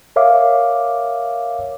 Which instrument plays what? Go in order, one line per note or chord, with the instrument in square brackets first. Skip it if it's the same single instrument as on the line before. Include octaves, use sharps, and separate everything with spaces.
[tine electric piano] A#4 C#5 E5 F5 D6